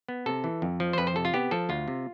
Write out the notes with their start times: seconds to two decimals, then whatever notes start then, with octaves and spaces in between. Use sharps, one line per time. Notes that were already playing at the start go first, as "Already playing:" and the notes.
0.09 B3
0.26 C3 A4
0.44 E3
0.62 F2
0.80 F3
0.93 C5
0.98 F2 B4
1.07 C5
1.16 C3 A4
1.25 F4
1.34 B3 G4
1.51 F3 A4
1.69 D2 F4
1.88 C3